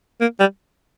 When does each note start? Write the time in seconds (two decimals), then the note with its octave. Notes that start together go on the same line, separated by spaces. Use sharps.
0.21 A#3
0.40 G3